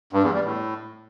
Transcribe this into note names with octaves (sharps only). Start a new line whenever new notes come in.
G2
E2
G3
A2